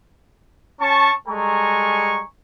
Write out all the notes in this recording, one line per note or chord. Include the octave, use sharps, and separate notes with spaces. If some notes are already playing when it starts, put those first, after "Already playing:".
C#4 A5 C#6
G3 G#3 A4 G#5 A#5 C#6